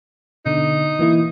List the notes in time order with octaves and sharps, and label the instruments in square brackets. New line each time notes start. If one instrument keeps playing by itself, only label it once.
[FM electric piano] B2 D3 [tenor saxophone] D#4
[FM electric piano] E3 A#3 E4